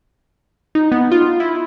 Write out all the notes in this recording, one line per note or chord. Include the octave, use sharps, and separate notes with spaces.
D#4
B3
F4
E4